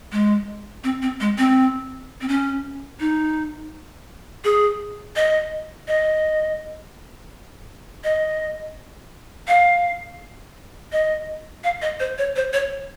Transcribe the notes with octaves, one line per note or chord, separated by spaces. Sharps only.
G#3
C4
C4
G#3
C4
C4
C#4
D#4
G#4
D#5
D#5
D#5
F5
D#5
F5
D#5
C5
C#5
C5
C#5